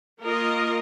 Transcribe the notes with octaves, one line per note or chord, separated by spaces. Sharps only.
A#3 F4 A#4 D#5